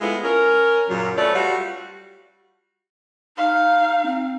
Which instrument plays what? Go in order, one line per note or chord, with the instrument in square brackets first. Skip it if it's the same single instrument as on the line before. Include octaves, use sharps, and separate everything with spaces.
[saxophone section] G#3 A3 B3 E4 F4
C#4 A#4
F#2 A#2 C#3 F#3
A3 C#4 B4 C#5 D5
G3 F4 F#4
[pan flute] D#4 [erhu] F5
[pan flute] C4